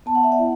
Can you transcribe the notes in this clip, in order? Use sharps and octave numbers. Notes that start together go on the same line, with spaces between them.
B3 A5
F#5
E5
D5 F#5
E4